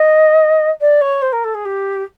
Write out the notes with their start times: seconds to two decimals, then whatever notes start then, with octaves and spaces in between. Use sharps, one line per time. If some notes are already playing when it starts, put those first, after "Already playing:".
Already playing: D#5
0.80 D5
1.01 C#5
1.21 C5
1.32 A#4
1.44 A4
1.54 G#4
1.65 G4